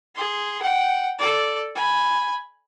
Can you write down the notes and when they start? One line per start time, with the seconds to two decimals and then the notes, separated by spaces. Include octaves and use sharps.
0.15 G#4 C6
0.61 F#5 G5
1.18 A4 D5
1.75 G#5 B5